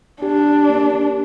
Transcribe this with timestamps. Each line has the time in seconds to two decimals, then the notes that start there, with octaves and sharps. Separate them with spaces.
0.22 D4 G4
0.69 A#3